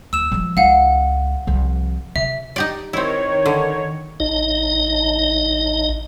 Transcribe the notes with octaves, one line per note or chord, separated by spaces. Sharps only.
D#2 E6 E7
F3 G#3
C#2 D#4 F5 F#5
C2 F3
C3 E5
D#4 G4 D5
D#3 C4 E4 C#5
D3
A1 D#4 D#5